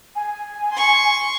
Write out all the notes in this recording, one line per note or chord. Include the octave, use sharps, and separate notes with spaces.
G#5
C6 C#6